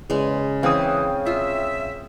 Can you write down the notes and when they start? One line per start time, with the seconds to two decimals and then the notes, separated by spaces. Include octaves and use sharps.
0.10 E2 C#3 G#3
0.63 C#3 E3 C4 F5 G5 D#6
1.26 F4 E5